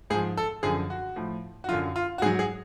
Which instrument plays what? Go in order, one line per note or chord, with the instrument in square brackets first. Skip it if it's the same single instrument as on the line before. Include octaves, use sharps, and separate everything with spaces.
[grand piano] G#2 G#4
F3
A4
F#2 D3 F3 G#4
F#4
A2 F3
F#4
F#2 D3 F#3 F4
F4
F#4
G#2 G#4
F#3
G#4